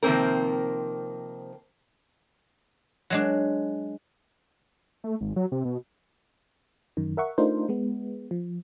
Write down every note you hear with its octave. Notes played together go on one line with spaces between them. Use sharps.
C3 D#3 F3 A#3 C4 A#4
F#3 G#3 D4
A3
G#1
F#3
C3
B2
F#2 D#3
A#4 E5 F#5 C#6
A3 D4 D#4 F4 A#4 C5
G#3 B3
F3